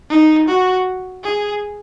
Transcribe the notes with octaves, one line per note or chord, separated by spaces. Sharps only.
D#4
F#4
G#4